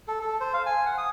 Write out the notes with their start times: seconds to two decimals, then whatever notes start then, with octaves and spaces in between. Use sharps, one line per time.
0.08 A4
0.21 A4
0.40 C5
0.54 F5
0.66 G#5
0.86 F#5
0.98 D#6